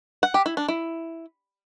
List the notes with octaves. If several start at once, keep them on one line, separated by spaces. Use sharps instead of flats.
F#5
G4
E4
D4
E4